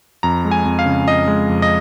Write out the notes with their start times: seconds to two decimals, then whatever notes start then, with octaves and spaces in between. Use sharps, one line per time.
0.23 F2 A#5
0.45 G#3
0.51 G#5
0.65 F2
0.79 F5
0.86 C#3
1.07 F2 D#5
1.28 G#3
1.49 F2
1.62 D#5